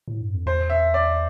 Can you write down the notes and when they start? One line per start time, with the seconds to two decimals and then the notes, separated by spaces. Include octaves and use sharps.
0.08 A2
0.21 G2
0.34 F2
0.46 E2 C5
0.70 E5
0.94 D5